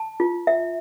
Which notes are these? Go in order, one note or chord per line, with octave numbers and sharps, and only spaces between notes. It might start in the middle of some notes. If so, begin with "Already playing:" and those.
Already playing: A5
F4
E5